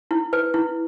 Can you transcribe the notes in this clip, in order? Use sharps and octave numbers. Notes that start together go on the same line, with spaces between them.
E4
B4
E4